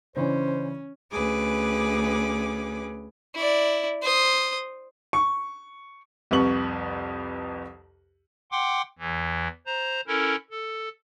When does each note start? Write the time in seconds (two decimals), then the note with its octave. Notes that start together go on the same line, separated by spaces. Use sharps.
0.16 C#3 E3 C#4 D4 C5
1.11 D2 C#4 G#4 B4 D6
3.35 E4 D5
4.02 C5 D#6
5.13 C#6
6.31 C2 F2 B4 C#6 F#7
8.51 F#5 G5 C6 D6
8.99 E2 E3
9.66 C5 A#5
10.07 C#4 E4 A4 A#4
10.50 A4